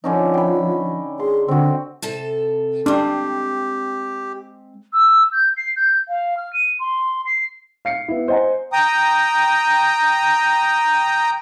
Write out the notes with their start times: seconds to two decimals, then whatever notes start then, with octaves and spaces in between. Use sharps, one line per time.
0.04 D3 F3 C#4 D#4
0.34 G5 B5
1.20 G#4 C6
1.48 D3 C4 F#4
2.02 C3 A4 A5
2.86 G#3 C4 D4 G4
4.93 E6
5.32 G6
5.56 C7
5.76 G6
6.08 F5
6.37 F6
6.53 D#7
6.80 C6
7.25 C7
7.85 F5 C7 C#7
8.08 B3 E4
8.28 C5 D#5 F#5 G#5 A#5
8.73 G5 A#5 D#6